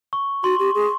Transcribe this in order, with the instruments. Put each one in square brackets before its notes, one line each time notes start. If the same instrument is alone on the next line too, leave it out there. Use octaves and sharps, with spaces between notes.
[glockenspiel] C#6
[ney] F#4 [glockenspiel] C6
[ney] G4
G#4